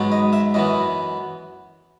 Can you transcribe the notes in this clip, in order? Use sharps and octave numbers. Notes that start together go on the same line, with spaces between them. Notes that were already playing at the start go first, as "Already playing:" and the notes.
Already playing: G#2 F#3 B3
D#5
E5
F#2 E3 B3 D#5